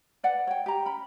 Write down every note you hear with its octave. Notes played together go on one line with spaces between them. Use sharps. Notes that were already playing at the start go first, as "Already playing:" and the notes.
B4 D5 F#5
C#5 G5
G4 A#5
C#4 B5